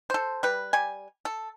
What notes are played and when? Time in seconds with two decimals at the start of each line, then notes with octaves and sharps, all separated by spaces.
0.10 A4 C5
0.43 G3 B4
0.73 G3 G#5
1.25 A4